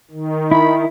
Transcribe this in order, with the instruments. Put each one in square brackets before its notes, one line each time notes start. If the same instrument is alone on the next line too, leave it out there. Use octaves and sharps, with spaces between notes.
[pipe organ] D#3
[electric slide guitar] E4 [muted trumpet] B5